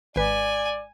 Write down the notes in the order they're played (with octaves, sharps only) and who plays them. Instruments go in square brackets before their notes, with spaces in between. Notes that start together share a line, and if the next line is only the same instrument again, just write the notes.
[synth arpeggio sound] G#1 B4 [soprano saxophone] D5 [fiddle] G#5